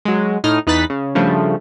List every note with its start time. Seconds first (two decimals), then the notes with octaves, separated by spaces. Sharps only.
0.05 F#3 G#3
0.44 A2 D#4 D#6 F6
0.67 E2 D#4 B4 F#6 A6 B6
0.90 C#3
1.15 G2 C#3 F3 A3